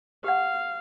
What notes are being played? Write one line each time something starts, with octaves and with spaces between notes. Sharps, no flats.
G4 F5 F#5